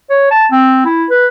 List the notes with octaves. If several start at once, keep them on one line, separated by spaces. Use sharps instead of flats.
C#5
A5
C4
E4
B4